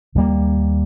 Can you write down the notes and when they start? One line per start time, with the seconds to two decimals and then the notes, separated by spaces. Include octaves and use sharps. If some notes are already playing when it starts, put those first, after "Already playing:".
0.15 D#2 D3 G3 A#3